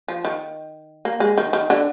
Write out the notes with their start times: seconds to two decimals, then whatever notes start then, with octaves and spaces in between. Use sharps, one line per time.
0.08 F3
0.25 D#3
1.05 A#3
1.20 G#3
1.38 D#3
1.53 D#3
1.70 D3